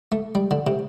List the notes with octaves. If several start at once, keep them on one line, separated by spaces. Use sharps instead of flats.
A3
G3
D3
C3